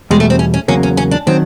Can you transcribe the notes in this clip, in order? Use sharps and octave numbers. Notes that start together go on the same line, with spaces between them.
E2 B2 G3 G#3
A3
C4
C#4
C#4
E2 C#3 F#3 A#3 C#4
C#4
C#4
D4
D#3 F#3 C4